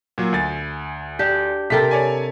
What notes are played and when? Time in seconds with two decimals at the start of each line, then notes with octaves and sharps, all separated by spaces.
0.18 A#2 F#3
0.33 D2 G#5 A6
1.19 D4 G4
1.70 C3 A4 A#4 G5 B6
1.91 C#5 D5 G#5